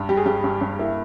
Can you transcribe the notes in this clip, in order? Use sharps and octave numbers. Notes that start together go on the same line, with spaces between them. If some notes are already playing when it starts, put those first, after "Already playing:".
Already playing: G2
G3 G4
G#4
G2 G4
G2
G2
A#3 E4